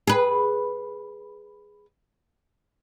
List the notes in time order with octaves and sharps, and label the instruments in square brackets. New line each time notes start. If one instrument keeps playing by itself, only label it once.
[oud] G#4 B4